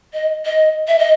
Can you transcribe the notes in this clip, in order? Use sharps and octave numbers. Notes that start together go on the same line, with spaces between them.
D#5
D#5
E5
D#5